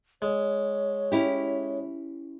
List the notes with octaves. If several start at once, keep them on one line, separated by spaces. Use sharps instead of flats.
G#3 C#5
C#4 E4 G4